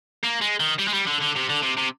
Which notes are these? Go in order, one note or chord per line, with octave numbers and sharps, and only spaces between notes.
A#3
G#3
D#3
G3
G#3
G3
D3
D3
C3
D3
C3
C3